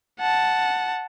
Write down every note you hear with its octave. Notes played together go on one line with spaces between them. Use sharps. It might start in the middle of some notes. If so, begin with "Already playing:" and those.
F#5 A5